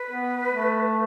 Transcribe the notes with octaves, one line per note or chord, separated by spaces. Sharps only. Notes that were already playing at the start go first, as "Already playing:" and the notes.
Already playing: B4
B3
A3